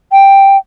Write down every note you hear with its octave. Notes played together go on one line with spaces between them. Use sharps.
G5